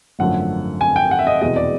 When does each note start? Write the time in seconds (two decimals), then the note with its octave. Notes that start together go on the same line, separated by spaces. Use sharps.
0.19 G#1 F#2 D3 F3 A3 F#5
0.81 G#5
0.96 G5
1.11 F#5
1.19 E5
1.27 D#5
1.41 F1 E2 B2 G#3 D#5
1.56 D5